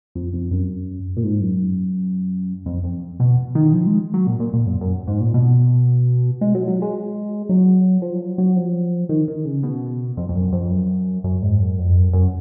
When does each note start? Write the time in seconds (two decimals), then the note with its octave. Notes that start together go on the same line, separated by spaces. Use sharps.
0.15 F2
0.33 F2
0.51 F#2
1.17 A#2
1.23 G#2
1.41 F#2
2.66 F2
2.84 F2
3.20 B2
3.55 D#3
3.73 F3
3.86 G#3
4.14 F#3
4.27 A#2
4.40 A#2
4.53 A#2
4.66 F#2
4.81 F#2
5.07 G#2
5.20 A#2
5.34 B2
6.41 G#3
6.55 F#3
6.68 F#3
6.82 G#3
7.49 F#3
8.02 F3
8.20 F#3
8.38 F#3
8.56 F3
9.09 D#3
9.28 D#3
9.45 C#3
9.63 B2
10.17 F2
10.29 F2
10.35 F#2
10.53 F2
10.70 F#2
11.24 F#2
11.42 G#2
11.60 F#2
11.78 F2
11.96 F#2
12.13 F#2